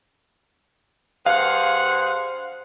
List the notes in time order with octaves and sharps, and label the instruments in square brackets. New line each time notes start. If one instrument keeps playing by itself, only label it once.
[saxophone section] G2 G#4 F#5 [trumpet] C5 [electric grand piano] F5